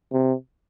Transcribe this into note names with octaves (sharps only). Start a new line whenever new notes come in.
C3